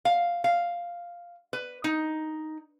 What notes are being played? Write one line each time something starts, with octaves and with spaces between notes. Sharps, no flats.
F5
F5
B4
D#4